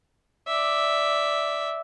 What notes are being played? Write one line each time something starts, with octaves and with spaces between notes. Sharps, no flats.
D5 E5